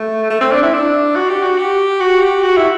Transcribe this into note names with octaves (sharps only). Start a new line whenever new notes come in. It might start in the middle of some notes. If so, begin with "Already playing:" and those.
Already playing: A3
A3
C4
D4
E4
D4
F#4
G4
F#4
G4
F#4
G4
F#4
E4